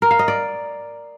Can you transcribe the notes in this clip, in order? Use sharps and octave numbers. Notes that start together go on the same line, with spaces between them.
A#4
F5
D#5
D5